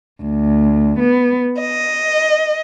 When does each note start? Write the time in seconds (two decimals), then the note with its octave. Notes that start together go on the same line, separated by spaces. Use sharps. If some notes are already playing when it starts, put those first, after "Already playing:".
0.24 D2
1.00 B3
1.60 D#5